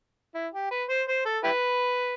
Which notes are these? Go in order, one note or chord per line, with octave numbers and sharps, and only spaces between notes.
E4
G4
B4
C5
C5
A4
E4 G4 B4